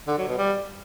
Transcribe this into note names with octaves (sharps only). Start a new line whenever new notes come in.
D3
F#3
B2
G3